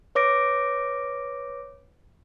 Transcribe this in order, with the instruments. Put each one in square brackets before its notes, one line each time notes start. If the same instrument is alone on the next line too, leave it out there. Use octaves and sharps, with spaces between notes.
[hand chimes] B4 C#5 D6 A#6 D7